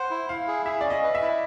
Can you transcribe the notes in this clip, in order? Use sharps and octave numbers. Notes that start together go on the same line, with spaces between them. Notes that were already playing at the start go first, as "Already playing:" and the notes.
Already playing: C5 F#5
E4
E4 F5
G#4
G#4 E5
C#4 D5
D#5
B4
E5
E4